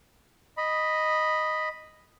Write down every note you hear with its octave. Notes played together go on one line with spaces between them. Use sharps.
D#5 B5